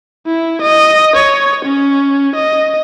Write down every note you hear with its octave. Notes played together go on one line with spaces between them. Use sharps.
E4
D#5
C#5
C#4
D#5